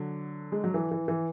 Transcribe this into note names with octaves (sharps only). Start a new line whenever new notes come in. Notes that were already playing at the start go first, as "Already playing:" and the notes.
Already playing: D3 F#3
G#3
F#3
E3
E3
E3